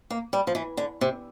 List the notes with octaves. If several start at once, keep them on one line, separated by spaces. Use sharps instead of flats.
A#3
G3
F3
E3
D3
C3